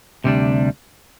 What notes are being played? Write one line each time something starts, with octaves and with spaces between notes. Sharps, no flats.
D2 C3 G3 D4